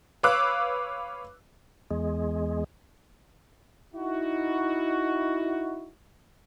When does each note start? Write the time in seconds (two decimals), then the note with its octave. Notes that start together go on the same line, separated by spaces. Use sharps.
0.23 B4 C#5 F5 D6 E6 F#6
1.91 E2 G#3
3.95 D#4 E4 F#4